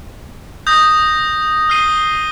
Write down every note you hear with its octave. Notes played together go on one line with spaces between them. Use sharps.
D#6 G6 A#6
F6 C7 D#7 G7